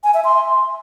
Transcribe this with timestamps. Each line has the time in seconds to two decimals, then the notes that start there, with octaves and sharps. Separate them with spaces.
0.04 G#5
0.14 E5
0.24 C6